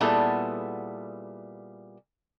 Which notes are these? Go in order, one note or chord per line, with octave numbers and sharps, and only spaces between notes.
A#2 G3 B3 E4 G#4 A4